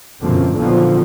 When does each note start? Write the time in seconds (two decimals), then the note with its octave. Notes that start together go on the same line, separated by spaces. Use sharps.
0.21 F#2 B2 D3 F3 A#3 C4
0.54 A#1 D3 D#3 F3 F#3 B3